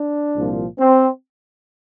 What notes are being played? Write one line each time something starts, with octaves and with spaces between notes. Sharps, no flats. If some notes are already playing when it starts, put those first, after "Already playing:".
Already playing: D4
C2 A#2 F3
C4